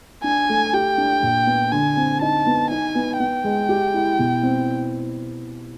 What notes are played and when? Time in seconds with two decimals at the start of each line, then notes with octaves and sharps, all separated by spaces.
0.24 D4 G#5
0.49 A3
0.73 G4 G5
0.98 D4
1.22 A#2
1.47 B3
1.72 D3 G#5
1.97 C4
2.21 D#4 A5
2.46 B3
2.70 D#4 G#5
2.95 B3
3.20 B3 G5
3.44 G#3
3.69 G4
3.93 E4
4.19 B2
4.43 C4